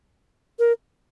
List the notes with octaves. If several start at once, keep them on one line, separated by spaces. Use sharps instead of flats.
A#4